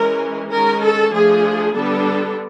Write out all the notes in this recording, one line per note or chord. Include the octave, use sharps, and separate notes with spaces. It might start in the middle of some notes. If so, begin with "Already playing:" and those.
Already playing: E3 G#3 C#4 A#4
D#3 G#3 C#4 A#4
A4
F3 A3 D4 G#4
D3 G3 B3 D4 A4